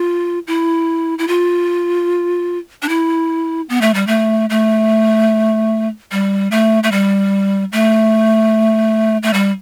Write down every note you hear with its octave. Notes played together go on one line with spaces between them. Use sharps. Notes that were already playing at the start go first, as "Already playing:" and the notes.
Already playing: F4
E4
E4
F4
D4
E4
B3
A3
G3
A3
A3
G3
A3
A3
G3
A3
A3
G3